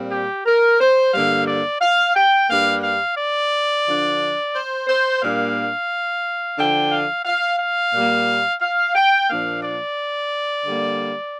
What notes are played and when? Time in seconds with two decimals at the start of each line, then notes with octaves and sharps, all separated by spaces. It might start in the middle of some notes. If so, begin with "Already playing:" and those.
Already playing: A#2 G3 C4
0.12 G4
0.46 A#4
0.80 C5
1.14 G2 D3 G3 A#3 F5
1.48 D5
1.82 F5
2.16 G5
2.50 G2 G3 A#3 D4 F5
2.84 F5
3.18 D5
3.85 D3 F3 D4
4.54 C5
4.88 C5
5.22 A#2 G3 A#3 D4 F5
6.57 D3 F3 D4 G5
6.92 F5
7.25 F5
7.60 F5
7.93 A#2 G3 A#3
8.61 F5
8.95 G5
9.29 A#2 F3 A#3 D4 F5
9.63 D5
10.65 D3 G3 A#3